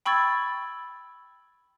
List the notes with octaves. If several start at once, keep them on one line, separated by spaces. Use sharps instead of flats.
G5 B5 C#6 E6 G#6 A6